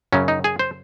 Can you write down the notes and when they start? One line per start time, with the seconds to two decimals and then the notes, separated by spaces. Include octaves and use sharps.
0.13 F#2 C#3 F#3 C#4
0.28 D#4
0.44 G#4
0.59 C5